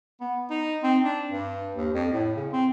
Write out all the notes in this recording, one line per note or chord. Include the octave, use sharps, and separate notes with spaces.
B3
D#4
C4
D4
G2
D#2
F2
A2
C#3
C4